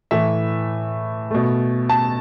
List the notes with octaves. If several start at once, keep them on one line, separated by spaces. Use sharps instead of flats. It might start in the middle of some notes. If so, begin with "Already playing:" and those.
A2 E3 A3 E5
B2 A3
A5